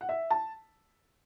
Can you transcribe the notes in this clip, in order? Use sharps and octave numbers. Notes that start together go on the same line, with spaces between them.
F#5
E5
A5